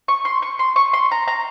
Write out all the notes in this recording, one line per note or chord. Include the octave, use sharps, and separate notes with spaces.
C#6
C6
C#6
C6
C#6
C6
A#5
A#5